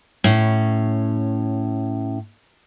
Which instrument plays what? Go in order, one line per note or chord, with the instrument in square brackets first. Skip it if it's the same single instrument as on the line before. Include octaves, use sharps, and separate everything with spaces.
[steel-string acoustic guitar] A2 C#4